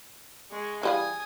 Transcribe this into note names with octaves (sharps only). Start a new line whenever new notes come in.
G#3 C#6
E3 G3 F5 G#5 D#6